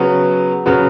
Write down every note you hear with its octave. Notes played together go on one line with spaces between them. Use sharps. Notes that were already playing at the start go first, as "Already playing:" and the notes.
Already playing: C#3 F#3 B3
C#3 F#3 B3